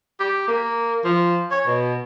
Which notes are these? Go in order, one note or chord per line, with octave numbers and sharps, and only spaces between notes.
G4
A#3
F3
C#5
B2